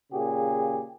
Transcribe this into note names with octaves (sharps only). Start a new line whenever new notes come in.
A#2 C#3 G4 G#4